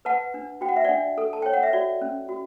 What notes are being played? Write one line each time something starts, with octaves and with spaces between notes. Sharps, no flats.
B4 F#5 A5
D4
F#4 G5
F#5
E5
D4 D5 F#5
A4
A5
C#5 G5
F#5
E5
F#4 D5
C#4
F#4